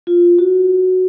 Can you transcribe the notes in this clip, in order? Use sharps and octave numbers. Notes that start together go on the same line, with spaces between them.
F4
F#4